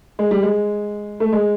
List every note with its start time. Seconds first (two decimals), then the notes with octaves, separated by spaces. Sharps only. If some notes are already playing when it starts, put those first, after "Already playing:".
0.19 G#3
0.31 G3
0.43 G#3
1.20 A3
1.33 G#3